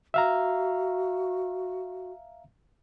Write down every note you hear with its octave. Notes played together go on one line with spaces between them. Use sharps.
F#4 E5 F5 A#5